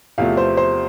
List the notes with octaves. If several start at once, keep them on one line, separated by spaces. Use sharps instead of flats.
E2 C3 F3 A3 F5
C5
C5